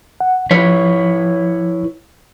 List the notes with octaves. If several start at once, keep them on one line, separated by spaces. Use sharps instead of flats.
F#5
F3 E4 B4 C#5